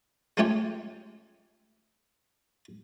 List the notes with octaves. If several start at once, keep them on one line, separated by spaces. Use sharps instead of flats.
G#3 A3 C#4 F4 G4 C#5